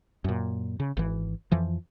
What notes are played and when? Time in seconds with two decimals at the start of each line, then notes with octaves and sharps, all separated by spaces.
0.24 F#2 A#2
0.80 C#3
0.97 G#1 E3
1.52 F2 E3 F3